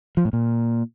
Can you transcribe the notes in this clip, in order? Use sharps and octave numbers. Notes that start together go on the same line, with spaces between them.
F3
A2
A#2